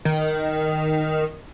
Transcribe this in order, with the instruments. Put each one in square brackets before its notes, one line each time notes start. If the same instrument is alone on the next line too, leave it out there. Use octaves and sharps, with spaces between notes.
[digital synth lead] D#3